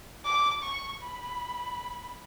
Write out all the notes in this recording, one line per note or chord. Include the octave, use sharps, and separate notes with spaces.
D6
C#6
B5